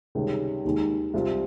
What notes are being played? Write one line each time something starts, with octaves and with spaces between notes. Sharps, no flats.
C#2 C3 D#3 G3 C#4
D#2 D#3 G#3
C2 C3 G3 C4 F4